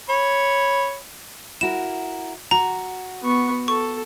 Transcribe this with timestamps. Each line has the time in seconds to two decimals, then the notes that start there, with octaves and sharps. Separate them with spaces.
0.09 C#5 B5
1.61 E4 F#4 A#4 E7
2.51 F#4 A#5
3.23 B3 C#6
3.68 A4 C#6